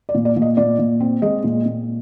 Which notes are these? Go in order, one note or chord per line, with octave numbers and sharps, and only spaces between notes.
D5
A#2
D5
A#2
D#5
A#2 D5
A#2
C4
G#3 D#5
A#2
A#2